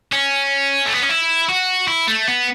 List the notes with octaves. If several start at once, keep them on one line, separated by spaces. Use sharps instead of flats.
C#4
A3
B3
C#4
E4
F#4
E4
A3
B3